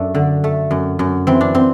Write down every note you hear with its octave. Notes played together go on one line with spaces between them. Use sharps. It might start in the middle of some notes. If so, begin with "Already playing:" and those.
Already playing: F#2 A3 D4
D3
A3
F#2
F#2
E3 C4
D4
C4